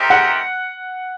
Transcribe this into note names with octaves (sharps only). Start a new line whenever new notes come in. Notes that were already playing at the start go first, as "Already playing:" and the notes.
Already playing: A3 C4 D#4 G4 A#4
F#5